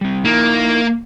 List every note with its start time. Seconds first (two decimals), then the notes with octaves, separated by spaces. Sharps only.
0.01 G3 C4
0.25 A#3 D#4 E4 A#4